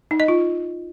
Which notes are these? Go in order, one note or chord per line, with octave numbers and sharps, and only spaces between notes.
D#4
D#5
F4